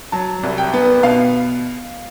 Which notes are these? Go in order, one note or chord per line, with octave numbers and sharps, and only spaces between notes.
F#3 A5
C2
G5
B3
B2 F5